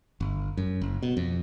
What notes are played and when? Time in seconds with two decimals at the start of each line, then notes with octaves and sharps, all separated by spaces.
0.21 G1
0.57 F#2
0.81 F#1
1.02 B2
1.17 F2